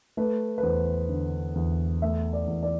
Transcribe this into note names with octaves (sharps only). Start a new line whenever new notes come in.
A3 B4
B4
E2 C5
D3
E2
A3 E5
D5
E2
D5